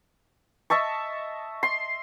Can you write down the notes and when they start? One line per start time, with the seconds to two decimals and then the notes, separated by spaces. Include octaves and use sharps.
0.70 D#5 E5 A5 C#6
1.63 C6